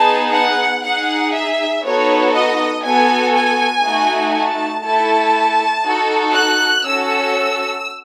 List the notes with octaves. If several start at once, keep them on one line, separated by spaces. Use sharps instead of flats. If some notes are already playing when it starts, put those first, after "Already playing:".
Already playing: B3 D#4 G#4 A5
F#5
D#4 G#4 F#5
E5
B3 D#4 F#4 A4 C#5
D#5
B3 F#4 A4 G#5
G#5
A3 D#4 F#4
A5
A3 E4 A4 A5
D#4 F#4 A4
F#6
C#4 F#4 A4 E6